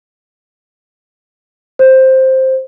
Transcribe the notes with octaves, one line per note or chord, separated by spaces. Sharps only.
C5